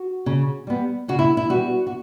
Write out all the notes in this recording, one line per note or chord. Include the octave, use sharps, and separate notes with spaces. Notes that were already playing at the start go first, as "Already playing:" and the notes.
Already playing: F#4
C#3
G3 B3
C#3 F#4
E4
E4
G3 B3 F#4
F#4